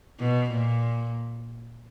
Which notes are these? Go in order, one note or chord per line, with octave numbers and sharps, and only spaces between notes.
B2
A#2